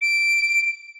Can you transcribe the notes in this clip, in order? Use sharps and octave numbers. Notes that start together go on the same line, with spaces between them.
D7